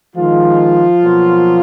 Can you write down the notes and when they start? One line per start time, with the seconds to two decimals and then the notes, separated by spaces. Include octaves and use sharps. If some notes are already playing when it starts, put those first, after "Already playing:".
0.16 D#3 F3 G#3 F4
1.02 B2 F#3 A#3